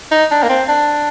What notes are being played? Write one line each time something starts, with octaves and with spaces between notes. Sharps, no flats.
D#4
D4
A#3
C4
D4